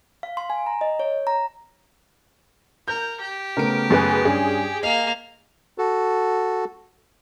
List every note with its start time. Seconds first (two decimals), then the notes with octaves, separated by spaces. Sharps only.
0.23 F5
0.37 C6
0.50 G#5
0.66 A#5
0.81 D#5
0.99 C#5
1.27 A#5
2.88 A#4 G6
3.20 G4
3.57 C#3 A3 B3 A#4 D7
3.90 F#2 G#4 B4
4.25 G2 C#4 G#4
4.83 A#3 D#5 F5
5.78 F#4 A4